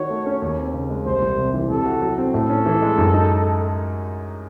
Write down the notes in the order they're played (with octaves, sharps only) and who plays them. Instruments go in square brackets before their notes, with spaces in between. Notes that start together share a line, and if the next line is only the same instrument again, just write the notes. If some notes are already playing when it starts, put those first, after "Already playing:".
Already playing: [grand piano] D#3 F#4 [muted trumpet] C#5
[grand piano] A3
C#4
D#2
C4
C#3
G#3
[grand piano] C2 [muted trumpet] C5
[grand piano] C2
C3
E3
[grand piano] C3 [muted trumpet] A4
[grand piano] F#4
F#3
C4
[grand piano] A2 [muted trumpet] A4
[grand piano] C#4
E3
G#3
F#2
D#4